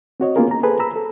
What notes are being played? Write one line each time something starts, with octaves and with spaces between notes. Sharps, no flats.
C4 F#4 C#5 D#5
A#3 B3 C#4 F4 G#4 A#4
A#5
G#4 A4 B4 C5
A#5 B5 E6
A4